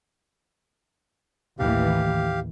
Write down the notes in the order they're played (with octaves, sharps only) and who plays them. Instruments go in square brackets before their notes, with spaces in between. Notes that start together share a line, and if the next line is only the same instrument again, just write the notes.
[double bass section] A1 D#2 E3 [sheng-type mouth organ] G4 F5